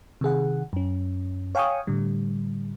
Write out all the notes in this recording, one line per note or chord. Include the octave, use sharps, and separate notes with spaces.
C3 D#3 G#4 F#5
F#2 C#4
C#5 F5 G5 G#5 C#6 D#6
A2 D3 G3